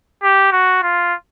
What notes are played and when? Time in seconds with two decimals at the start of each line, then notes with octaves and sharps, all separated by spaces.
0.23 G4
0.52 F#4
0.83 F4